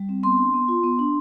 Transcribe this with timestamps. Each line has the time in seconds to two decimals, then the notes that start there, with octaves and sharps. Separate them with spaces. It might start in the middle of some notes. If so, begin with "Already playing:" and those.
Already playing: G3
0.09 C4
0.23 B3 C6
0.38 D4
0.54 B3
0.68 F4
0.84 B3
0.99 D4